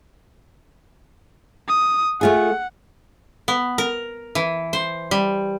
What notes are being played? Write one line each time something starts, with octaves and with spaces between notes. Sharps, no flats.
D#6
A3 F4 G#4 F#5
B3
A#4
E3
C5
G3